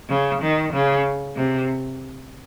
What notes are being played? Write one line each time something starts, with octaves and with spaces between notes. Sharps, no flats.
C#3
D#3
C#3
C3